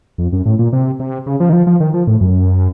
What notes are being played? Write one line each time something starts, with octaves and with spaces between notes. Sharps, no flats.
F2
F#2
A2
A#2
C3
C3
C#3
F3
D#3
F3
F3
D#3
F3
A2
F#2